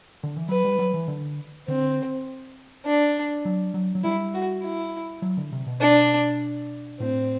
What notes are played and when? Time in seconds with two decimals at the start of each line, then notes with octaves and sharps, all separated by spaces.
0.23 D3
0.36 E3
0.49 F#3 B4
0.65 G3
0.79 F#3
0.94 E3
1.08 D3
1.68 D3 C4
2.86 D4
3.45 F#3
3.74 F#3
3.95 F#3
4.04 G3 E4
4.34 F#4
4.63 E4
5.22 F#3
5.37 D3
5.52 C3
5.67 B2
5.81 D4
7.00 A2 C4